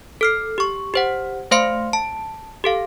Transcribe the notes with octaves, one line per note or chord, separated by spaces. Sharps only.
A4 F6 C7
G4 C#6
G4 C5 F#5
A3 C5 F5 C6 C#7
A5
G4 A4 F5